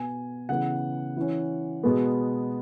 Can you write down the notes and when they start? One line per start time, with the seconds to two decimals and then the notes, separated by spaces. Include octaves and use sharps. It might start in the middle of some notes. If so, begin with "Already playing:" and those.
Already playing: B2 B3 G#5
0.49 C#3 E3 B3 F#5
1.16 E3 C#4
1.83 B2 G#3 B3